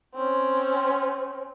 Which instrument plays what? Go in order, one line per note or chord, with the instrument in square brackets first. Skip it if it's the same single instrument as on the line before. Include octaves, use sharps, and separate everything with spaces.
[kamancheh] C4 C#4